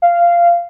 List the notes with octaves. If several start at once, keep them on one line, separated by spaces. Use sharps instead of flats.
F5